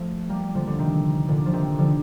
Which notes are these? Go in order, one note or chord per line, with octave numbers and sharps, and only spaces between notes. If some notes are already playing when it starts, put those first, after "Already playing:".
Already playing: F3 A3
G3 A#3
D3 F3
D3
C3 D#3
A#2 D3
F3
C3 D#3
D3 F3